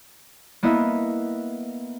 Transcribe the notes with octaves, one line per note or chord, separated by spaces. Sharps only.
A#3 B3 E4 D#5 E5